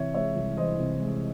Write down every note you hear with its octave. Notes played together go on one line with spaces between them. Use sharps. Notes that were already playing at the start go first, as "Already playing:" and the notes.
Already playing: C3 E3 C#5 E5
G#3 C#5 E5
C2
E3 C5 D#5
C3
G#3